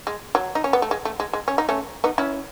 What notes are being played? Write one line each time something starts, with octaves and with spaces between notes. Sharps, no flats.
G#3
F#3
D#4
C#4
B3
A3
G#3
A3
G#3
G#3
C#4
D#4
A3 C#4
B3 D#4
C#4 E4